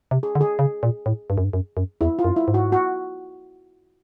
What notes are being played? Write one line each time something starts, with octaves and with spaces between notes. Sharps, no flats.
C3
G#4
D3
G#4
C#3
A#2
A2
G2
F#2
G2
F#2
F#2
E2 E4
F4
F#2
E4
G#2
F#4
F#4